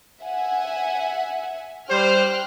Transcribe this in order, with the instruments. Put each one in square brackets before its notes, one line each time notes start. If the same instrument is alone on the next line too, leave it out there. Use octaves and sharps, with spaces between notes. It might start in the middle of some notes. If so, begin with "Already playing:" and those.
[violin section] E5 F#5 G#5
[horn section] G3 G4 C5 [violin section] G5 F6 F#6